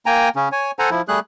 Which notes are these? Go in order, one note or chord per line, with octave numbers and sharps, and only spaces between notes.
A#3 G5 G#5 A#5
C#3 C#4
C#5 G#5
A4 C5 F#5 G#5 A#5
F3 E4
G3 A3 G#4 F#6